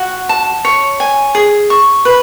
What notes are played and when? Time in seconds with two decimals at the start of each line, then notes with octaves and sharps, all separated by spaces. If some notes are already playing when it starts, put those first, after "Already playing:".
Already playing: F#4
0.29 A5
0.65 C#5
1.00 G#5
1.35 G#4
1.70 C#6
2.05 B4